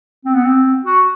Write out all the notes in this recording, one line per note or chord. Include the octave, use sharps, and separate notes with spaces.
C4
B3
C4
F#4